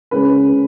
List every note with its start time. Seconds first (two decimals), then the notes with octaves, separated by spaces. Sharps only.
0.11 C#3 G#3 C#4 B4
0.52 C#3